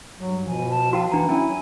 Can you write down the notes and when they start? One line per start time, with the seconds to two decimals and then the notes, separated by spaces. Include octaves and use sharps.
0.20 G2 F#3
0.47 B2 F3 G#5
0.69 A5
0.93 F#4 F5 G5 A5
1.11 F#1 E3 D4 F#5 A#5
1.29 F#3 C#4 E4 G#5